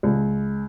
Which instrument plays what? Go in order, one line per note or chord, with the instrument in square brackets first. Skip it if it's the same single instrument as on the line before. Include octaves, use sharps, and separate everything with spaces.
[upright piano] C#2